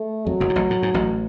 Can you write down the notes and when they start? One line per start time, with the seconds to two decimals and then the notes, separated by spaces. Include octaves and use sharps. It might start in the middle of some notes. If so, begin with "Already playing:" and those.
Already playing: A3
0.27 F2 F#3
0.40 F#1 F#2
0.49 G#2
0.56 A1 A2
0.70 A2
0.83 G#2
0.94 A1 A2